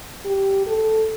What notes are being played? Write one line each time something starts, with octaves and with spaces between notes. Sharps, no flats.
G4
A4